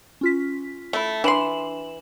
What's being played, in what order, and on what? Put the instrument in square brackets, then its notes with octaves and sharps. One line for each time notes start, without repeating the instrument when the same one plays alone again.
[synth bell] C#4 F4 B6
[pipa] A3 E4
[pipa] E3 C6 [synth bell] D4 E7 F#7